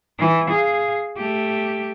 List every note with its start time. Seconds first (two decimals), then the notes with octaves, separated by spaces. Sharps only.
0.19 E3
0.50 G#4 F5
1.17 A3 G4